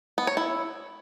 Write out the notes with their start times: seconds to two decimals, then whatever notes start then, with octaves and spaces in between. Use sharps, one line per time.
0.18 B3
0.27 C#5
0.37 E4